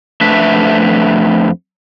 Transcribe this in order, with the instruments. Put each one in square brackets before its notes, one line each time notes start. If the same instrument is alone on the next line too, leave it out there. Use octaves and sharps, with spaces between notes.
[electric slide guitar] F2 A3 D4 B4 E5